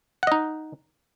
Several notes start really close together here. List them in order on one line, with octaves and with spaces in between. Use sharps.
F#5 D#5 D#4